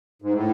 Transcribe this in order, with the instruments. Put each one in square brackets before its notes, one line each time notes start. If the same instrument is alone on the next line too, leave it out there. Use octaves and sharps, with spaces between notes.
[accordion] G#2
A2